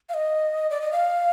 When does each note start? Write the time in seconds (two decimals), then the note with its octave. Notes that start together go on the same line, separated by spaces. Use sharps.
0.09 F5
0.14 D#5
0.70 D5
0.81 D#5
0.92 F5